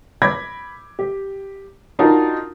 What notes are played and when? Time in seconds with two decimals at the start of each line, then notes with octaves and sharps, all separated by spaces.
0.22 B5 D6 G#6 A#6
0.99 G4
1.99 D4 D#4 F4 F#4 A#4